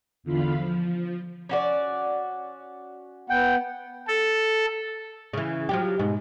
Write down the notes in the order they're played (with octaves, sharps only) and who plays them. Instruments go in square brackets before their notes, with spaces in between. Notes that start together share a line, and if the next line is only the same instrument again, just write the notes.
[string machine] E2 D3 F4 F5 B5
F3
[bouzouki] C#4 F#4 D5
[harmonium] B3 F#5 [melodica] G5
[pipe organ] A4
[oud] C#3 E3
F3 F#3 G4
G#2 B2